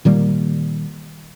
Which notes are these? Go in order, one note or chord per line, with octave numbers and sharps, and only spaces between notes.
A#2 D#3 G3 A#3